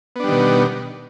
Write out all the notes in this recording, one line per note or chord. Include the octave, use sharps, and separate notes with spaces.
B2 D#3 G3 B3 D4